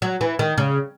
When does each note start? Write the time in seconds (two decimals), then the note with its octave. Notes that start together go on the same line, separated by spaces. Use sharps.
0.02 F#3
0.21 E3
0.39 D#3
0.58 C#3